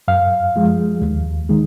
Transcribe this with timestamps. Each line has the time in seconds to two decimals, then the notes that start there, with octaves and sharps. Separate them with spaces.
0.08 F#2 F5
0.56 F3 G#3
1.02 D#2
1.49 D#3 G#3